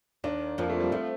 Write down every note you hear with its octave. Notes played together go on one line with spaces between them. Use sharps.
D#2 D#3 D4
F2 F3 A#3
A3
G3
F3 A3